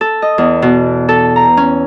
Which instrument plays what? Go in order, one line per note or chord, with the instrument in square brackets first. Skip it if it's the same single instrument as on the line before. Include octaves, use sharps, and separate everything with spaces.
[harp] A4
D#5
E2
B2
A4
A#5
C#4